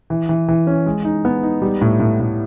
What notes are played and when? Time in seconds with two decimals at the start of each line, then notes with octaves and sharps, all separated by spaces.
0.10 E3
0.29 E3
0.48 E3
0.67 C#4
0.86 G#3
1.05 D#4
1.25 B3
1.43 D#4
1.62 G3
1.81 A2
2.00 A2
2.20 A2